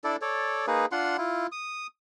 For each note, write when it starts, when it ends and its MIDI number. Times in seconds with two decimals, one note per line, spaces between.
0.04 0.16 62
0.04 0.16 64
0.04 0.16 69
0.04 0.16 74
0.22 0.66 69
0.22 0.66 73
0.22 0.66 74
0.67 0.86 58
0.67 0.86 63
0.67 0.86 68
0.67 0.86 71
0.92 1.17 62
0.92 1.17 65
0.92 1.17 78
0.92 1.17 84
1.18 1.47 64
1.18 1.47 65
1.52 1.87 87